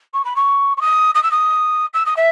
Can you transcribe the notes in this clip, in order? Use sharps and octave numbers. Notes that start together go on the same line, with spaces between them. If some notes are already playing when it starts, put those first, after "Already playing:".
C#6
B5
C#6
C#6
D#6
D#6
E6
D#6
E6
D#6
E5